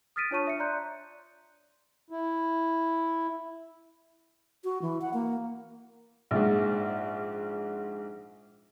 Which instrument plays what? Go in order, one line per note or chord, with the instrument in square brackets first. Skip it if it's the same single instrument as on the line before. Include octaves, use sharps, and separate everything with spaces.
[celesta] D#6 F6 A6 B6 D7 D#7
D4 F4 C#5 A5 C#6 D#7
D4 E5 C#7
D5 A#5 C6 F#6 G6
[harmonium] E4
[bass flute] F#4
E3
F#5
A#3
[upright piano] A#1 G#2